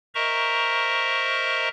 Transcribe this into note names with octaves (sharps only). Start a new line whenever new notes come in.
A#4 C5 D#5 E5 A#5 C#6